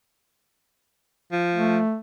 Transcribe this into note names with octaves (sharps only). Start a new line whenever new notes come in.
F3
A3